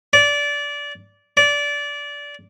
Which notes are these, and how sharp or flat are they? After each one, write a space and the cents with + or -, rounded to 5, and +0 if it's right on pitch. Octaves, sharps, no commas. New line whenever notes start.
D5 -20
D5 -20